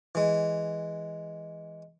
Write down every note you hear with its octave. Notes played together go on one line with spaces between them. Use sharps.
E3 G#3